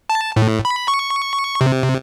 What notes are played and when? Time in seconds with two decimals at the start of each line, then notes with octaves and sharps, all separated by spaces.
0.10 A5
0.36 A2
0.65 B5
0.88 C#6
1.61 C3